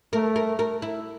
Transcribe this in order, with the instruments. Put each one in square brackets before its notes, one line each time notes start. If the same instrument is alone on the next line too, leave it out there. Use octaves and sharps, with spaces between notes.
[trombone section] A3 [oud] A#4
[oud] A#4
A#4
E4